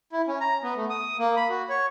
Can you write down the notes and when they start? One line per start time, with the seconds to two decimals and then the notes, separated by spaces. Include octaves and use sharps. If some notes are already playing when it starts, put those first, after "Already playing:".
0.12 E4
0.27 C#4
0.41 A#5
0.63 B3
0.76 A3
0.90 D#6
1.19 A#3
1.36 B5
1.49 F#4
1.69 C#5